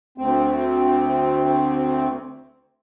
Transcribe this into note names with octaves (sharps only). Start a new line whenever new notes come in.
D2 C4